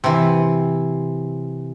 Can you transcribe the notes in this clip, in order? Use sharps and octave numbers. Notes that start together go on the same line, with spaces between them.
C3 E3